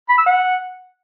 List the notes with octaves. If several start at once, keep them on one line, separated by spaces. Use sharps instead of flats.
B5
E6
F#5